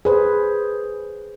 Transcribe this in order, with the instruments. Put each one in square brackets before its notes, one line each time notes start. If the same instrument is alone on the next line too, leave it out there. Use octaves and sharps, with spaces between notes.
[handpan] G#4 B4 C5